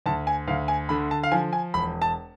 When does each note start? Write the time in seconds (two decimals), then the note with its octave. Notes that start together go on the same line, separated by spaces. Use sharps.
0.06 D2 A5
0.27 G#5
0.47 D2 F5
0.68 G#5
0.89 D3 B5
1.11 A5
1.23 F5
1.31 F3 G#5
1.53 G#5
1.74 E1 B5
2.02 A5